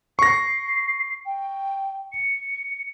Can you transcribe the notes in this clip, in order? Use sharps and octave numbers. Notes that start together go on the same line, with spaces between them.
C#6 A#6 C7
G5
C#7